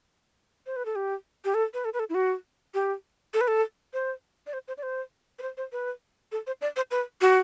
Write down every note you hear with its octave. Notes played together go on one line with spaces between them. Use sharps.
C5
B4
A4
G4
G4
A4
B4
A4
B4
A4
E4
F#4
G4
A4
B4
A4
C5
D5
C5
C5
D5
C5
B4
C5
C5
B4
A4
C5
D5
C5
B4
F#4